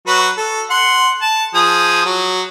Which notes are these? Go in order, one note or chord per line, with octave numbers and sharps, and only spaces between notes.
F#3 F#4 B4
A4
F#5 C6
A5
F3 G#4 D#6
F#3